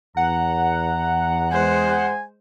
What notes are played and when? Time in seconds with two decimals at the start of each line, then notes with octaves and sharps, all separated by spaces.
0.17 E2 F#5 A#5
1.51 G#3 C5 G#5